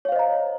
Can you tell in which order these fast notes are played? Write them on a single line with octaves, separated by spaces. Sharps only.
C#5 F5 C5 D#5 A#5